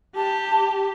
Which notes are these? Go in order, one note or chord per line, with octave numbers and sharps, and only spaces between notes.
G4 A5